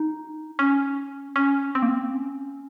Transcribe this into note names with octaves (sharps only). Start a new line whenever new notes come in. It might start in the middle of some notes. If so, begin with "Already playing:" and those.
Already playing: D#4
C#4
C#4
C4
A#3
C4
C#4